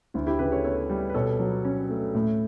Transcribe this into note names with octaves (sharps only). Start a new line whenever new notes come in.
D2 E4
E4 G4
C#3 G4 B4
A4 C#5
B3 A4 C#5
G3
B4
B2 A4 C#5
F#3
C#4
A3
A2